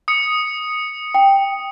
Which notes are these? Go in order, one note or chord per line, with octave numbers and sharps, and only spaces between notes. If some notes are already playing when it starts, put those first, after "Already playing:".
D#6 C#7
G5